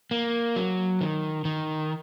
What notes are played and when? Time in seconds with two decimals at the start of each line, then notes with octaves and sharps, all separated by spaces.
0.11 A#3
0.56 F#3
1.01 D#3
1.45 D#3